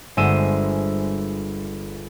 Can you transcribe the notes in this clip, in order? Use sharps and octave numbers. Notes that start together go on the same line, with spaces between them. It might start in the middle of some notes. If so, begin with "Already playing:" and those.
G1 G#3 C5 E5 E6 D#7